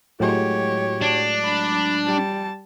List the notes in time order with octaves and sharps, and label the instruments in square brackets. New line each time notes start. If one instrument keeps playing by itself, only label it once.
[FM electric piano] A2 F#3 G#3 [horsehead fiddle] G4 C#5
[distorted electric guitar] D4
[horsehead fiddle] B5
G3 A5